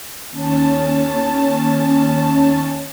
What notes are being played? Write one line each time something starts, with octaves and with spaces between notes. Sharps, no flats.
D#2 C#4 A5